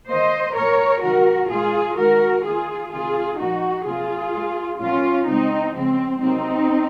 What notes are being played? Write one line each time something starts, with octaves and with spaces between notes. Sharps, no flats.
D#3 A#3 C5 D#5
A#2 F#3 A#3 A#4 C#5
C3 D#3 F#3 A#3 F#4 A#4
A#2 G#3 F4 G#4
D#3 G#3 F#4 A#4
D#3 A#3 F4 G#4
C3 D#3 G#3 F4 G#4
A#2 F3 A#3 D#4 F#4
C3 F#3 A#3 F4 G#4
A#2 G#3
A#2 F#3 A#3 C#4 F4
C#3 G#3 C4 D#4
C#3 F3 G#3 C4
C3 F#3 A#3 C4 D#4